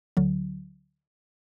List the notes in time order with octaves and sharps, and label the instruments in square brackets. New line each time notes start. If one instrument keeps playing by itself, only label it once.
[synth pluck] D2 D3 F#3